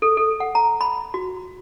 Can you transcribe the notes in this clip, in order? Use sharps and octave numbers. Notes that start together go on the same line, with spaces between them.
A4
A4
F#5
A#5
B5
F#4